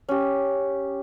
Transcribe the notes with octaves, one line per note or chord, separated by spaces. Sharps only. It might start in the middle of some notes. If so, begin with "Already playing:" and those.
C#4 G4